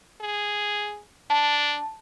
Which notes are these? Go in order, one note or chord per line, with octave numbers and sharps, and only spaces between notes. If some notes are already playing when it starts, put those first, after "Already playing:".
G#4
D4 A5